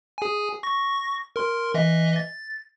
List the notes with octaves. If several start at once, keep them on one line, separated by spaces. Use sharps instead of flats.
G#4 G#5
C#6 A#6
A#4 C6
E3 D#5 E5
A6